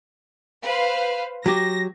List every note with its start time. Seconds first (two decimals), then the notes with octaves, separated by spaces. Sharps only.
0.64 B4 C5 F5
1.46 F#3 G4 A#6